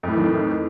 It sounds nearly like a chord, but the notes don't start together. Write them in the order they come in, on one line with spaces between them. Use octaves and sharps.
F2 A2 E3 D#3